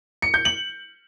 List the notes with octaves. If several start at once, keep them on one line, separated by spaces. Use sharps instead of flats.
C#7
G6
F#7